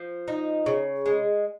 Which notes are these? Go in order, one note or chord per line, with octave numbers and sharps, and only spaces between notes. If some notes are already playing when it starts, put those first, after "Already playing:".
Already playing: F3
D#4
C#3
G#3